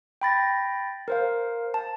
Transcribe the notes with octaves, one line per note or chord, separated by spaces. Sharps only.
G5 B5 A6 A#6
A#4 C5 F5
A5